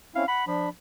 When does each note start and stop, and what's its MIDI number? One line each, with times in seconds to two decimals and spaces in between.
0.15 0.24 60
0.15 0.24 61
0.15 0.24 64
0.15 0.28 77
0.28 0.44 78
0.28 0.47 83
0.47 0.68 53
0.47 0.69 62
0.47 0.69 83